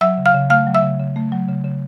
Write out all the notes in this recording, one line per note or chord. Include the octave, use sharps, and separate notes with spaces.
F#3 E5 E6
C#3
F5 F6
C#3
A3 F5 F6
F#3
E5 E6
C#3
C#3
A3
F#3
C#3
C#3